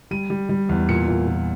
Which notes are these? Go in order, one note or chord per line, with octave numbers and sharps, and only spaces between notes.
G3 D#7
G3
G3
E2
A#2 C#7
A#2
A#2